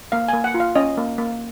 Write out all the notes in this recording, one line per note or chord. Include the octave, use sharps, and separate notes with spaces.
A#3 F5
A#3 G#5
F#5
F4
F5
C#4 D#5
A#3
A#3